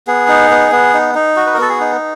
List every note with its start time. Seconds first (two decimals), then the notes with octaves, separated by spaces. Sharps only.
0.07 B3 G#4
0.28 D#4
0.50 B3
0.72 B3
0.94 D#4
1.15 D#4
1.36 F#4
1.46 B4
1.54 A#4
1.58 B3 A4
1.69 G#4
1.80 D#4